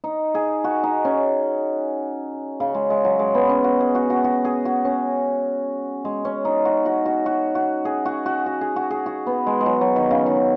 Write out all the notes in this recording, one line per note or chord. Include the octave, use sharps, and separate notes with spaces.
D#4
G#4
F#4
D#4
C#4
C#3
G#3
G#3
F#3
G#3
B3
C#4
F#4
G#4
F#4
F#4
F#4
G#4
F#4
C#4
G#3
C#4
D#4
F#4
F#4
F#4
F#4
F#4
G#4
F#4
F#4
F#4
G#4
F#4
G#4
F#4
B3
G#3
G#3
F#3
F#3
D#3
C#3
D#3